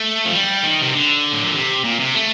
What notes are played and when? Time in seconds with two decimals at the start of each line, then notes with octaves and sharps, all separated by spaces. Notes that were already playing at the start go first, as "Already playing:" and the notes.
Already playing: A3
0.25 F3
0.33 G3
0.63 D#3
0.81 C3
0.93 D3
1.33 A2
1.43 A#2
1.54 C3
1.84 A#2
2.00 C3
2.15 A3